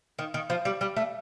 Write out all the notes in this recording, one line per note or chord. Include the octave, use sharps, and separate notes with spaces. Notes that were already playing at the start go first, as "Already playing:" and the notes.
D#3
D#3
F3
G3
G3
A3